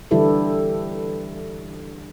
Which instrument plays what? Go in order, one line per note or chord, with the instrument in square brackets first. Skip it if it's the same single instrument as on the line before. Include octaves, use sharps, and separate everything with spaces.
[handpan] D3 E3 G3 E4 G4 A4